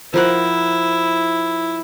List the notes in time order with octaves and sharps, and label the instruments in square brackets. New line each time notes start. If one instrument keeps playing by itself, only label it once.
[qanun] F3 A#4 F#5 [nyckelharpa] E4